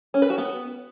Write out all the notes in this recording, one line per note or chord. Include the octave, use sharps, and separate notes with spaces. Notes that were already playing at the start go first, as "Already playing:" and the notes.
C#4
B4
F#4
B3